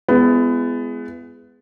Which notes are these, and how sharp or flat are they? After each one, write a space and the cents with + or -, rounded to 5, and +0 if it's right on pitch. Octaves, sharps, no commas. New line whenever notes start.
G#3 +0 B3 +20 E4 +40